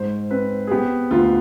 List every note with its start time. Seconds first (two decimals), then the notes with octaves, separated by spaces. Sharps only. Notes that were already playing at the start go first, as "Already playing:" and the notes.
Already playing: G#2 C5
0.30 C4 B4
0.67 G#4
0.71 B3 G4
1.11 D2 F4